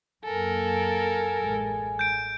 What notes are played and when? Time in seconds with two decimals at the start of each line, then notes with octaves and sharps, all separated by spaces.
0.25 F#2 A#3 A4 A#4 G#5
1.41 A1 G#3
1.99 G6 D7